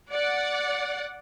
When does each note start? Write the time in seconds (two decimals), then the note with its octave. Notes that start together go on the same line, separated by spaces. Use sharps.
0.12 D5 F#5